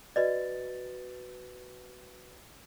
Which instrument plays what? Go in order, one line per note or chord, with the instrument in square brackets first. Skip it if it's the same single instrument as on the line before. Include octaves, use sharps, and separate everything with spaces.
[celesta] F#4 B4 A6 [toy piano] D5 D#5